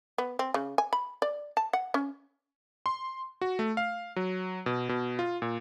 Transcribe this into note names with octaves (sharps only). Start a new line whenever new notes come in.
B3
C4
C#3
G#5
B5
D5
A5
F#5
C#4
C6
F#4
A3
F5
F#3
B2
B2
F4
A#2